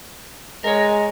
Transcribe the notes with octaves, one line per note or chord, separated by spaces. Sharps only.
G#3 A#4 C#5